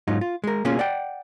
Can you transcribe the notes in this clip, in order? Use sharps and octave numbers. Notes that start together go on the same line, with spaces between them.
G#2 F#3 D#4 F4
F4
G#3 A#4
B2 A#3 C#4 F4 G#4
D5 F#5 G5